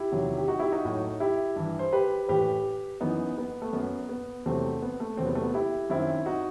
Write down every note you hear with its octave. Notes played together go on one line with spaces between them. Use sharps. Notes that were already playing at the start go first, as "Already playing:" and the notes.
Already playing: E4 G4
E2 C3 D#3 F#3
G4
D#4 F#4
E4 G4
D#4 F#4
A2 F#3
E4 G4
G2 E3
C5
G4 B4
A2 E3 G4 B4
F#2 E3 B3 D#4
B3
A3
F#2 F#3 B3
B3
E2 C3 F#3 A3 C4
B3
A3
E2 C3 F#3 C4
B3
A3
B3
E4 G4
F#2 D#3 F#3 C4 E4
D#4 F#4